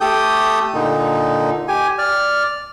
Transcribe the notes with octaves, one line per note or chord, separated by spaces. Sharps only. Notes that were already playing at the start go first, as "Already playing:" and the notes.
A3 G4 A4 G5 D#6 G6
A#2 D3 D#4
G4 G#5
D5 F6